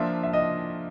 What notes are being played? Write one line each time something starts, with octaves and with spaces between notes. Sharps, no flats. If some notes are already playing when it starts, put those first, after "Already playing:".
Already playing: F3 A#3 D4 F4 E5
E5
D#5